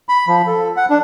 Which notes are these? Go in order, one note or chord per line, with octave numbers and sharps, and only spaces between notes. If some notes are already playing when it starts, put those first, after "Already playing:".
B5
F3
A4
F#5
D4